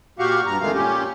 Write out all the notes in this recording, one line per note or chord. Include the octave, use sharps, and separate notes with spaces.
A#2 F#4 G4 F5 C#6
G2 A#5
F2 D#3 G#3 A3 F5
A#2 C#4 G4